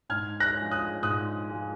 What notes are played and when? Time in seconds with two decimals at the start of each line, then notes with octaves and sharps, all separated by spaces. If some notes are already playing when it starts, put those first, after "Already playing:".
0.09 G#2 F6 G#6
0.40 F#6 A#6
0.56 F3 G#3
0.71 D#6 F#6
1.03 G#2 D#6 F#6
1.50 F3 G#3